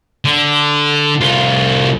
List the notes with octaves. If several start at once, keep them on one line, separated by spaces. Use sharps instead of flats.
D3
C2 F4